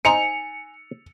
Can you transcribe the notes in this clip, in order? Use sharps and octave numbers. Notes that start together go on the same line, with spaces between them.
D#4 C5 G#5 C#7 F7